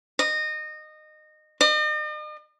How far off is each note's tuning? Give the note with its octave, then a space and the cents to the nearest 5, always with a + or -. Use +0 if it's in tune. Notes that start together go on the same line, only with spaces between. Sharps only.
D#5 -20
D#5 -45